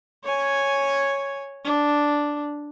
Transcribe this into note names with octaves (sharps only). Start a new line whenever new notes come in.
C#5 G#5
D4